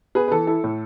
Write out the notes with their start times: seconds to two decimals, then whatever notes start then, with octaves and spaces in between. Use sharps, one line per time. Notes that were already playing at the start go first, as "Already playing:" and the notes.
0.15 B3 G#4 B4
0.28 B4
0.31 E3 A4
0.47 E4 A4
0.64 A2